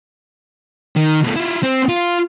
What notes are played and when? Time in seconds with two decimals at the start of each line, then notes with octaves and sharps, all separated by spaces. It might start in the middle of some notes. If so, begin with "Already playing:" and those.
0.96 D#3
1.24 B2 A3
1.36 E4 F4
1.63 C4
1.89 F4